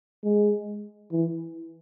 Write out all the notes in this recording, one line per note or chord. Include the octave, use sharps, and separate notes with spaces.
G#3
E3